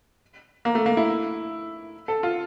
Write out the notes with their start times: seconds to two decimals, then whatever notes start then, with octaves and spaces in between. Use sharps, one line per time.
0.65 A#3
0.75 A3
0.86 A#3
0.97 E4
2.08 A4
2.23 F4